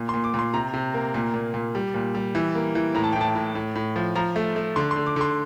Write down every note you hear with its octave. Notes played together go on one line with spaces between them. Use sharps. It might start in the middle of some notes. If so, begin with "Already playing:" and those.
Already playing: A#2
C6
A#2
D6
A#2
C6
C3 A#5
C3
A#3
A#2
A#2
A#2
G3
A#2
G3
E3
A#3
E3
A2 A#5
A5
A2 G5
A5
A2
A2
A2
F3
F3 A#5
A3
A3
D3 C6
C6
D3
D6
D3 C6